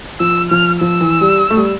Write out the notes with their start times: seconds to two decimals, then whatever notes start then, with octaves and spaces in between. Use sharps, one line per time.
0.20 F3 E6
0.51 F3 F6
0.81 F3 E6
1.01 E3
1.21 G3
1.51 A3
1.57 G3